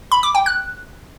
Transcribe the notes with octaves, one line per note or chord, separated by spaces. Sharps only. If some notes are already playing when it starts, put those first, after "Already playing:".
B5
D6
G5
F#6